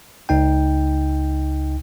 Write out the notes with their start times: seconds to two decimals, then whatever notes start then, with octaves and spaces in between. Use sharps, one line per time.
0.29 C#2 D#4 G5